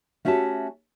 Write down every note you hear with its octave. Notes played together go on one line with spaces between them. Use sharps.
A3 C#4 F#4 G4 E5 A5